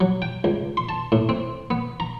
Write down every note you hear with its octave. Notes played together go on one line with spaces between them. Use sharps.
F#3
G5
C#2
C6
A5
A2
C4
B3
A#5